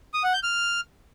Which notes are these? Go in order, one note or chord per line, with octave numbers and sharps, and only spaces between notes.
D#6
F#5
G6
F6